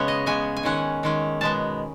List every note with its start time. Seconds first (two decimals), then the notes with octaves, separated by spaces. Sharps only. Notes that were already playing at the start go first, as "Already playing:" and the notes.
Already playing: C#3 G#3 B3 C#4 C#5
0.08 D#5
0.26 C#3 G#3 B3 G#5
0.57 G#5
0.63 D#3 G#3 C#4 F#5
1.03 D#3 G#3 C#4
1.41 B2 G#3 B3 A5